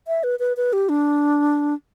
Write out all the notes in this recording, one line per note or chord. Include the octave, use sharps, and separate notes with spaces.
E5
B4
B4
B4
G4
D4